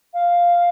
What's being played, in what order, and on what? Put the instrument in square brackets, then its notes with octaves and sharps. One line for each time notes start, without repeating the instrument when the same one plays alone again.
[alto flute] F5